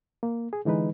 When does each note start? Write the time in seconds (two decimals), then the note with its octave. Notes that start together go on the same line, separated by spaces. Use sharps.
0.23 A#3
0.53 G#4
0.65 D3 E3 G#3 D#4 B4